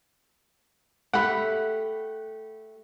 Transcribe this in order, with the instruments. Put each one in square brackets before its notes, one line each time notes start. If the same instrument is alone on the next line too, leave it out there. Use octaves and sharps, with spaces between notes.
[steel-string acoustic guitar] A3 G4 [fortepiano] F#5 B5